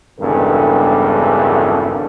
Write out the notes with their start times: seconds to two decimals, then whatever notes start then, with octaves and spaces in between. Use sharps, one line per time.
0.20 G#1 E2 G2 C#3 A4 A#4